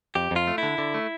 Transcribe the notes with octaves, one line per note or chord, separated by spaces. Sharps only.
F2 G4
F2 F4
A3
D3 E4
D3
A3